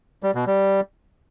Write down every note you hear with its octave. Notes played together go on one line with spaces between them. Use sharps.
G3
B2
G3